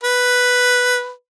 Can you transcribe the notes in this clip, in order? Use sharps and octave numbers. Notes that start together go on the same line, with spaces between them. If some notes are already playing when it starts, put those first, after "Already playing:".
B4